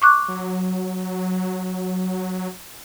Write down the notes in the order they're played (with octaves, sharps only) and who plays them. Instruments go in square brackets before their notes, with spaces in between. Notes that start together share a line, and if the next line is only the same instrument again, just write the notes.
[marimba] C#6 D6 F#6
[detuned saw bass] F#3